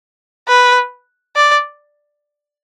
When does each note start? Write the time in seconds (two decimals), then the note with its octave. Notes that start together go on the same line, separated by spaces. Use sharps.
0.48 B4
1.35 D5